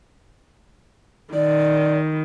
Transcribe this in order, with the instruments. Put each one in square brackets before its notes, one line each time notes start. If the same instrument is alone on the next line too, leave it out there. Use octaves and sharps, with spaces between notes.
[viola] D#3 [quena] D5